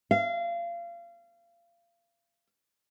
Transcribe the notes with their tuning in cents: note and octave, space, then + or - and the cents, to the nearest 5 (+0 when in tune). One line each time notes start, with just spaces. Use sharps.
F5 -30